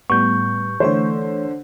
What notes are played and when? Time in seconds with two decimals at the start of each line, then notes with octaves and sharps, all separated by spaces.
0.10 A2 G3 B3 C#6 G6
0.80 D3 E3 A3 C5 C#5